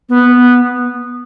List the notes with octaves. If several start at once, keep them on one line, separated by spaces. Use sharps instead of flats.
B3